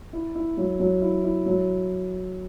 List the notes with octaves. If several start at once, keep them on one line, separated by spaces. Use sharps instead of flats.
E4
E4
F#3
F#3
E4
E4
F#3